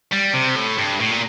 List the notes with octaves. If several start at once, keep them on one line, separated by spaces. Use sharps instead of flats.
G3
C3
A2
G2
A2
A#2